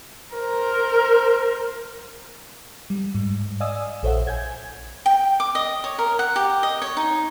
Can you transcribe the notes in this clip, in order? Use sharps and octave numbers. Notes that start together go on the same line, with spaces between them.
A#4 C5
G3
G#2
D5 D#5 F5 G#5 D#6 E6
A#1 A4 C5 C#5 E5 F#5
G#5 G6 G#6
G5
D6
D#5
C#5
A#4
F#5
G4
D#5
C#5
D#4